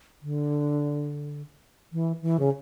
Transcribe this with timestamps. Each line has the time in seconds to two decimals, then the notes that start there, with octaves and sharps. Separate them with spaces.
0.22 D3
1.93 E3
2.22 E3
2.39 C#3